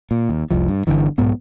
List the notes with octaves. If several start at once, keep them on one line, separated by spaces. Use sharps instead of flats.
A#2
D#2
F1 C2 F3
G2
G1 C#2 D3 E3
B1 G#2 B3